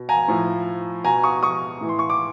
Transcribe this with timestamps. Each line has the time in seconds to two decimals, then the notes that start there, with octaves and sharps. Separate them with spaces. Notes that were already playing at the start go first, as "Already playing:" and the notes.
Already playing: B2
0.09 G#5 A#5
0.28 A2 F3
1.04 B2 G#5 A#5
1.23 C#6 D#6
1.43 C#6 D#6
1.81 A2 E3
1.89 C6
1.99 C#6
2.10 D6